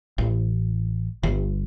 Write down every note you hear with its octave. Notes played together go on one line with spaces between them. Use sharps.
A1
G1